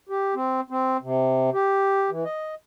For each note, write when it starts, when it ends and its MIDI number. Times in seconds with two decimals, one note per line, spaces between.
0.09 0.34 67
0.35 0.61 60
0.70 0.97 60
1.02 1.50 48
1.54 2.10 67
2.10 2.24 52
2.25 2.55 75